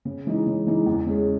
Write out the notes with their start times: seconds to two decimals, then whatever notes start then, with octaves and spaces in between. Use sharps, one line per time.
0.05 C#3
0.27 E3 G#3 D#4
0.47 C#3
0.67 E3 G#3 D#4
0.86 E2
1.06 C#3 G#3 C#4 G#4